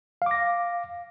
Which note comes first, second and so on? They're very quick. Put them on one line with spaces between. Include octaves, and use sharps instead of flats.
F5 D6 A#6